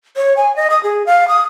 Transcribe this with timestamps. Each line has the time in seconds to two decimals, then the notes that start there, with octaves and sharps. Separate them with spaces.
0.16 C#5
0.36 G#5
0.56 D#5
0.70 D#6
0.83 G#4
1.06 F5
1.28 D#6